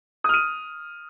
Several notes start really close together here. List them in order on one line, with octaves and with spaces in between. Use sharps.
D#6 F6 D#7